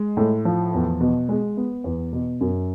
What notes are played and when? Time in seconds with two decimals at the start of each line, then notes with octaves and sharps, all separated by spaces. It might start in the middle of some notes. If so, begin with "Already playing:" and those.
Already playing: G#3
0.17 A2
0.45 F3
0.74 E2
1.01 B2
1.29 G#3
1.57 B3
1.84 E2
2.13 B2
2.41 F#2